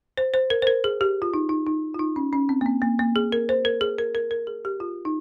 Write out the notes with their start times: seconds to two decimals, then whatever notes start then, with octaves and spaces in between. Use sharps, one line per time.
0.18 C5
0.34 C5
0.50 A#4
0.62 C5
0.67 A#4
0.84 G#4
1.01 G4
1.22 F4
1.34 D#4
1.49 D#4
1.67 D#4
1.94 F4
1.99 D#4
2.16 C#4
2.33 C#4
2.49 C4
2.61 A#3
2.66 C4
2.82 A#3
2.99 A#3
3.16 G#4
3.32 A#4
3.49 C5
3.65 A#4
3.81 G#4
3.98 A#4
4.15 A#4
4.31 A#4
4.47 G#4
4.65 G4
4.80 F4
5.05 D#4